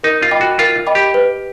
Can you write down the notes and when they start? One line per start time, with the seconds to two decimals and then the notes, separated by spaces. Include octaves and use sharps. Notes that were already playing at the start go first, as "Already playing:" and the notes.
0.03 D#4 A#4
0.22 F4
0.31 D#5 G5 B5 D6
0.41 F#4
0.59 F4 A#4
0.87 D#5 G5 B5 D6
0.95 G4
1.14 B4